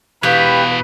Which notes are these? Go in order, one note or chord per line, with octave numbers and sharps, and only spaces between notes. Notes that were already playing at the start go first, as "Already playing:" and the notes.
B2 E3 G4 B4 F5